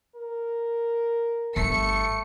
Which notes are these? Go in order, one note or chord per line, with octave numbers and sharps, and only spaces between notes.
A#4
G1 A3 C#7